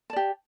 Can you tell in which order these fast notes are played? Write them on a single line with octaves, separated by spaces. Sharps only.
A5 D5 G4